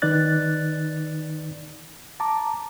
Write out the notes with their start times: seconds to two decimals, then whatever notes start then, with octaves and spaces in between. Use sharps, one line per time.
0.02 D#3 D#4 B4 D5 F#6 A6
2.20 A5 A#5 D6